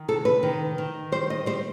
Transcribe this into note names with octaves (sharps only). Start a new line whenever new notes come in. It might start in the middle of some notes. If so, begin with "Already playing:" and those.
Already playing: D#3
C3 A4
B4
D#3
D#3
G3 C5
D#5
G3 C5